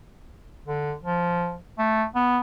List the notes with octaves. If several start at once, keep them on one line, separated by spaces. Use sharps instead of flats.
D3
F3
A3
B3